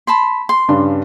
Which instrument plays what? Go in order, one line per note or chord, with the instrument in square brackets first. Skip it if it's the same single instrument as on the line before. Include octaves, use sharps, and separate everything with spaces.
[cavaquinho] A5 B5 C6
C6
[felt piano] G2 C#3 D4